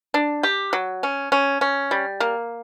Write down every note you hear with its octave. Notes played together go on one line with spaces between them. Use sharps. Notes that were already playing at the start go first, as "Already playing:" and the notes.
D4
G4
F#3
C#4
C#4
C#4
G3
A#3